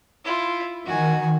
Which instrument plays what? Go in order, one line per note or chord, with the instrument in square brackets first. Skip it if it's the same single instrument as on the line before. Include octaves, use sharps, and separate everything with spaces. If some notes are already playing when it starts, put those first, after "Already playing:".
[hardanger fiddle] E4 F4
[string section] D#3 [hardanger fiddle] F#4 G#5